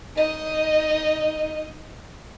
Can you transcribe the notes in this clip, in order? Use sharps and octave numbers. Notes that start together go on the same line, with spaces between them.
D#4 D#5